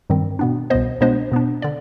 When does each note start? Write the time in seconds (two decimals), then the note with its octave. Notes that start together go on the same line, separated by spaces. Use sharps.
0.10 G2 D#3 G3 C4
0.39 B2 B3 D4
0.70 C2 B2 B3 C5 D#5
1.01 B2 G#3 B3 D4 C5 D#5
1.32 B2 B3 D4
1.62 D3 D5